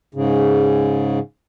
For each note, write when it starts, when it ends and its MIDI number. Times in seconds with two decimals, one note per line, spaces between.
0.14 1.19 44
0.14 1.19 49